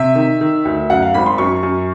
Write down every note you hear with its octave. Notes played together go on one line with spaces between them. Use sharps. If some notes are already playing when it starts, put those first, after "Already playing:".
Already playing: C3 E5
D#3
D#3
D2
F#2 F#5
F5
G#1 B5
C6
F#2 C#6
F#2